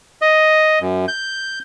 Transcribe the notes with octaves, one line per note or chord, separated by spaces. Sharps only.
D#5
F#2
G6